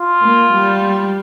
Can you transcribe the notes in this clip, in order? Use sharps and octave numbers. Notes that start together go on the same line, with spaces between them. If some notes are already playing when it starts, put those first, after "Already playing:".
Already playing: F4
A#3
G3